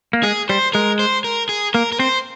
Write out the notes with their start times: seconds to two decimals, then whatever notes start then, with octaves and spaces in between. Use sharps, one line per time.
0.13 A#3
0.23 G#3 G#4
0.49 G3 C5
0.73 G#3 A#4
0.99 C5
1.24 A#4
1.49 G#4
1.74 A#3 A#4
1.92 A#4
2.00 C4 C5